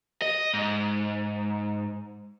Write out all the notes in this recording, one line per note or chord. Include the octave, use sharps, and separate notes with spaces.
D#5
G#2